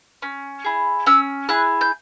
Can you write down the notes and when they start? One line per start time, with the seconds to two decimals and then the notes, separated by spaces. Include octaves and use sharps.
0.22 C#4
0.65 E4 G#4
1.06 C#4 E6
1.49 E4 G#4 F#6
1.81 G6